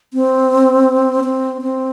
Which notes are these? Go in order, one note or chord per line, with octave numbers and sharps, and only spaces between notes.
C4
C4
C4